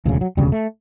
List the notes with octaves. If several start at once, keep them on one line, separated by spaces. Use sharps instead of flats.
E1 D2 C#3 E3
F#3
E1 D2 C#3 G3
A3